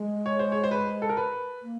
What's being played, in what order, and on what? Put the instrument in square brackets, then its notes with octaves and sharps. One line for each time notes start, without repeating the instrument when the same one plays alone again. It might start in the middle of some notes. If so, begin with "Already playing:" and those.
Already playing: [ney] G#3
[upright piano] C#5
C5
C#5
C5
B4
A4
A#4
B4
[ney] A#3